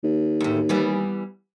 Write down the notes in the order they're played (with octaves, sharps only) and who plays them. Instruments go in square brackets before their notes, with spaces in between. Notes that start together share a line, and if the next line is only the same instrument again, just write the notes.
[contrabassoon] D#2
[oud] D2 A2
E3 G3 B3